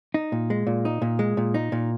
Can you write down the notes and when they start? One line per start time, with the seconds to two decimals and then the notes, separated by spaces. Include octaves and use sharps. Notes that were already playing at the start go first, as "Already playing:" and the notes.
0.14 D#4
0.32 A#2
0.50 G#3
0.67 A#2
0.85 D#4
1.02 A#2
1.19 G#3
1.37 A#2
1.54 D#4
1.72 A#2